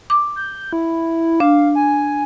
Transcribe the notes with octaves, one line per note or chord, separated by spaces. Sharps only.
D6
G6
E4
D4 F5
G#5